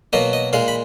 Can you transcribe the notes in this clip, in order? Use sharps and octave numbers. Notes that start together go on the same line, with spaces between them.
B2 F#3 A#3 D#5
D#5
A#2 G#3 F5
B5